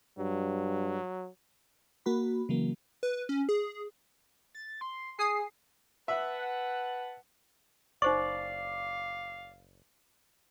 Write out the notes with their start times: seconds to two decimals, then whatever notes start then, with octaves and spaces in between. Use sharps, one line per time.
0.18 G2 F#3
2.06 A#3 F#4 B5
2.49 C#3 E3 F#3 A#3
3.03 B4
3.29 C#4
3.49 G#4
4.55 A6
4.81 C6
5.19 G#4 G#5 D#6 C7
6.08 B4 E5 F#5 A5
8.02 F#1 D#4 C5 D5 F5 C#6